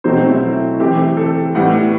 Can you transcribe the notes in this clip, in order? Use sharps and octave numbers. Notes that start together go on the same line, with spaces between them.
B2 F#3 A3 C4 C5
E4
E3 A3 C4 G4
A4
A2 G3 B3 F#5